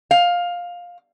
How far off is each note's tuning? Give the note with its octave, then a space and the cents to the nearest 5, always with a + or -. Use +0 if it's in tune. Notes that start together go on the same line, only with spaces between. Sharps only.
F5 +15